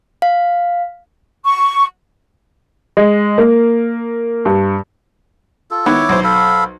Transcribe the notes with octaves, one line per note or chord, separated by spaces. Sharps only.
F5
C#6
G#3
A#3
G2
F4 A4
D#3 B3 E4 C#5 D6
B1 C5
A4 F5 B5